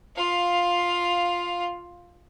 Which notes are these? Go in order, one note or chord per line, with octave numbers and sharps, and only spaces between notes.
F4 F5